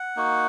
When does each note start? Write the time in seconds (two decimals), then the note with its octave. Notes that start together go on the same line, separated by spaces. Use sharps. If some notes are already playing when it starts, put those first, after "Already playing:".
Already playing: F#5
0.16 A#3 D#4 F#4